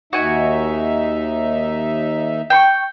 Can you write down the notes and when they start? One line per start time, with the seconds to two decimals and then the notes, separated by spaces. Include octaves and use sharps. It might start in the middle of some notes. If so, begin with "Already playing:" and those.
0.13 D#2 D#4 F#4 E5 G#5
2.50 G5 C6 C#6